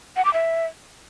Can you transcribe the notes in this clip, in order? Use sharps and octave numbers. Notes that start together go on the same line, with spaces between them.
F#5
D6
E5